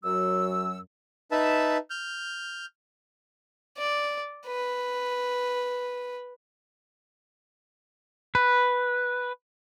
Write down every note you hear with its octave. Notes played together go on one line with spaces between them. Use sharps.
F#2 F#3 F#4 E6
D#4 B4 E5 A5
F6 G6
D5
B4
B4